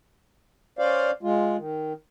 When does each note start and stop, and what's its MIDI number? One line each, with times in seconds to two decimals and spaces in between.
0.79 1.11 61
0.79 1.11 72
0.79 1.11 74
0.79 1.11 77
1.23 1.57 56
1.23 1.57 65
1.58 1.93 51